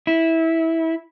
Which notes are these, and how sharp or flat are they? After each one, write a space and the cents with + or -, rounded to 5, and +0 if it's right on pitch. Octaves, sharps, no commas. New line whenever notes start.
E4 -15